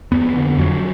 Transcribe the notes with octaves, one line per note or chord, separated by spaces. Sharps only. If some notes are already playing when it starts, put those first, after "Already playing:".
F2 B3
D3
F2 F#3